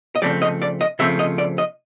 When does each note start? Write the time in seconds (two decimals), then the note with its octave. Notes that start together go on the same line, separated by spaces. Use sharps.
0.15 D#5
0.22 C#3 F3 A3 C4 D5
0.42 D#5
0.62 D5
0.81 D#5
0.99 C#3 F3 A3 C4 E5
1.19 D#5
1.38 D5
1.58 D#5